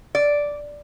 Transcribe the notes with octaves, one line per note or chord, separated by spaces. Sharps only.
D5